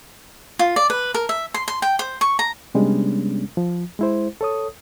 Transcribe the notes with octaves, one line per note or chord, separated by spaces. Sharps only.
F4
D5
B4
A#4
E5
C6
C6
G5
C5
C#6
A#5
C3 G3 G#3 B3 C#4 D4
F3
G#3 E4 C5
A4 C#5 D#6